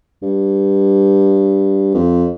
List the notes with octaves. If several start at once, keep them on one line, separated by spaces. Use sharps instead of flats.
G2
F2